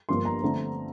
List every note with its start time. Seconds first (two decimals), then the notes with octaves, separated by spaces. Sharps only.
0.09 G1 G2 F3 A#3 C6
0.25 A#5
0.42 D3 F3 A3 C4